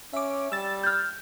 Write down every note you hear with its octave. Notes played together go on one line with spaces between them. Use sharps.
C#4 E5 D6
G3 E6 A6
F6 G6